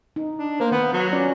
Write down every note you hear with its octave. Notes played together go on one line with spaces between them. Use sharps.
D#4
D4
A#3 C5
D#3 B3
F#3
C#4 F4 D5